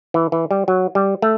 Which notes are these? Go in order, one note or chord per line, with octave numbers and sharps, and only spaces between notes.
E3
E3
G3
F#3
G3
A3